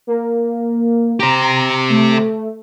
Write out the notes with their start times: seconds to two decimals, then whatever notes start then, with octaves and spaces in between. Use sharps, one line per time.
0.07 A#3
1.20 G4 C5 A#5
1.89 A3